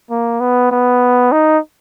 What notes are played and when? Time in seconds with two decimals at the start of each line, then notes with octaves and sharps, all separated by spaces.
0.10 A#3
0.41 B3
0.71 B3
1.32 D#4